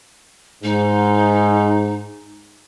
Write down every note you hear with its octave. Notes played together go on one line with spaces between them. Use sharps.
G#2 D#4